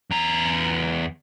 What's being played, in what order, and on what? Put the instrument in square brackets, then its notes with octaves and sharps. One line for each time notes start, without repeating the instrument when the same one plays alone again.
[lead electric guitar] E2 A#5